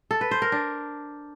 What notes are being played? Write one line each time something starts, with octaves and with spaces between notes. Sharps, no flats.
A4
B4
C5
A#4
D4